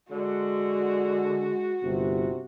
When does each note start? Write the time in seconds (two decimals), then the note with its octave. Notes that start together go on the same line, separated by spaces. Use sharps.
0.11 D3 G#3 F#4
1.83 G1 C3